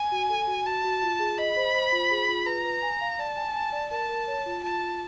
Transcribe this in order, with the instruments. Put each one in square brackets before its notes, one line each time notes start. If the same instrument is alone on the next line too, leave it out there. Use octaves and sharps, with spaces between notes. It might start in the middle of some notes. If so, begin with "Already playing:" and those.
Already playing: [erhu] G#5
[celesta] F#4
A4
F#4
[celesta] F#4 [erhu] A5
[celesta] F#4
F4
G#4
[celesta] D#5 [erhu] B5
[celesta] C5
C5
F4
G#4
F4
[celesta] B4 [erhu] A#5
[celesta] B4
G#5
F5
[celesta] D5 [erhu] A5
[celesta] G#5
G#5
D5
[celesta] A#4 [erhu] A5
[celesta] A#4
C#5
F4
[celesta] F4 [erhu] A5
[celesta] F4